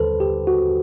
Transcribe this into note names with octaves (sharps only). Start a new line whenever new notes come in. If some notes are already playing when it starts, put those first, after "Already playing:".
Already playing: D#2 D3 G3 A4 B4 C5
G4
F#4